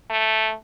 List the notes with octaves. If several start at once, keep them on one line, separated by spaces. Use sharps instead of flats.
A3